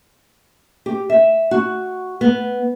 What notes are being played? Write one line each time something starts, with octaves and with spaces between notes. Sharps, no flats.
G4
E5
F#4
B3